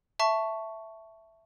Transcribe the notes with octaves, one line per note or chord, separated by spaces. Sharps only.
E5 A5 C#6